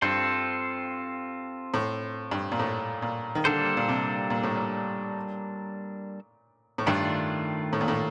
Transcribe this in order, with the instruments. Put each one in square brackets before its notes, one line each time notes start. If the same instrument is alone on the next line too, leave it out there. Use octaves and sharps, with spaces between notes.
[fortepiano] G2 [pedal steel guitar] C4 F4 A4 C5
[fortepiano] A2
G2
A#2
A2
A#2
D#3
[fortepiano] D3 [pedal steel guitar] G3 A#3 D4 A4 C5
[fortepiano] A#2
C3
A#2
A2
A#2
A2
[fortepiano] G2 [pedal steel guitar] D#3 A3 D4 F4
[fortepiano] A2
A#2
A2